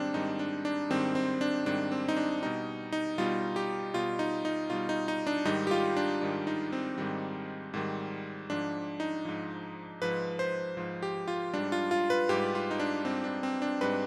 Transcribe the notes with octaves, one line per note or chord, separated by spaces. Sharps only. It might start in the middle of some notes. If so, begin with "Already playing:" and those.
Already playing: G#2 D#3 G3 C4 D4
G#2 D#3 G3 D#4
D4
D4
G#2 D#3 G3 C4
C4
D4
G#2 D#3 G3 D4
C4
D#4
D4
B2 G3 D#4
D#4
B2 G3 F4
G4
B2 G3 F4
D#4
D#4
B2 G3 F4
D#4
D#4
D4
G#2 D#3 G3 D#4
G4
F4
D4
G#2 D#3 G3
D#4
C4
G#2 D#3 G3
G#2 D#3 G3
G#2 F3 D4
D#4
G#2 F3
G#2 F3 B4
C5
G#2 F3
G4
F4
G#2 G3 D4
F4
F4
B4
G#2 G3 G4
F4
D#4
D4
G#2 G3 C4
D4
C4
D4
G#2 G3 B4